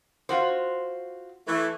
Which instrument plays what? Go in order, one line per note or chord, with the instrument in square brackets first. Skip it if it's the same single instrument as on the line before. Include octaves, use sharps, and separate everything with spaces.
[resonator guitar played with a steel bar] F4 F#4 C5
[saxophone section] E3 A3